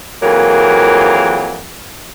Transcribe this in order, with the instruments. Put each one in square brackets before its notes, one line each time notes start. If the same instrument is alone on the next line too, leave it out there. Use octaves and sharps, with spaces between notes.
[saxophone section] F2 E3 F#3 A#3 G#4 A#4